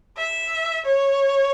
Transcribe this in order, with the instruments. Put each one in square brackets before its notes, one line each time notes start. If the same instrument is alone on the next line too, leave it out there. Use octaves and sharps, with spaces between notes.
[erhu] E5
C#5